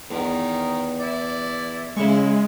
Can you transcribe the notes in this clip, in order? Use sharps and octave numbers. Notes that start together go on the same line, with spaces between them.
E2 D#3
E4 D5
C#3 G#3 E4 C#6